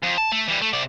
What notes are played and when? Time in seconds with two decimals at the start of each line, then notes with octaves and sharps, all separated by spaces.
0.03 F2
0.18 A5
0.32 A3
0.48 E3 G3
0.62 A3
0.73 C3 D5